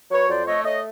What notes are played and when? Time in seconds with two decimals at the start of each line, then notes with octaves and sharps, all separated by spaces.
0.11 F#3 B4 C#5
0.29 F2 C5 D5
0.47 A3 C#5 D#5
0.65 A3 C#5 D#5